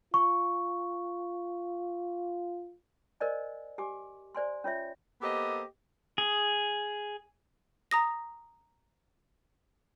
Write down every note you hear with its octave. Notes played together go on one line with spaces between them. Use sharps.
F4 C#6
A#4 C5 D5 D#5 G#5
G4 G#5 D6
C5 D5 G#5 C6
C#4 F4 C#5 E5
A#3 B3 G4 A4 C5 D#5
G#4
A#5 D#6 A#6